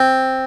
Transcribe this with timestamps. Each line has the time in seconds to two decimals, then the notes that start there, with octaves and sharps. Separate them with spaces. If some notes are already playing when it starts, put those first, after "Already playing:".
Already playing: C4